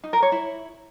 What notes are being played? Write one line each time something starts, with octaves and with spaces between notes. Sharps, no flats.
D#4
A#4
C#5
E4